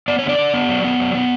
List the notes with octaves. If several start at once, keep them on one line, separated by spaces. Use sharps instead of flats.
B3 D5
D3 C#5
D5
D3
B3
F#3
B3
F#3
B3